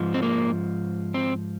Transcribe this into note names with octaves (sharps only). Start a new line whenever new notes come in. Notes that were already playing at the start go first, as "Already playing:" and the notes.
Already playing: G#2 F3
C4
A#3
C4